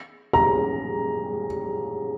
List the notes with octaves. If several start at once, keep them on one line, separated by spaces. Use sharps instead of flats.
A#5